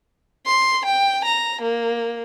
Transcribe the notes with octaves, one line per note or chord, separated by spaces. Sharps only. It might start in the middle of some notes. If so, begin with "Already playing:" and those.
C6
G5
A#5
A#3